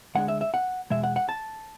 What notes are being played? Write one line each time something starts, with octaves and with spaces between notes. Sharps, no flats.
D2 D3 G#3 D4 F#5
E5
E5
F#5
E2 B2 G#3 E5
F#5
F#5
A5